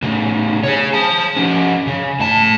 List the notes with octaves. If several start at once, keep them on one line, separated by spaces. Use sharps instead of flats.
A2 C#3
G#4 C#5
C5 A5
F3 C#4
C#3
A2 A5